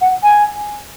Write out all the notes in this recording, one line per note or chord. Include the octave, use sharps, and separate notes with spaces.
F#5
G#5